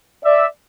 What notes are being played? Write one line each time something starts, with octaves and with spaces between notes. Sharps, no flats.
D5 E5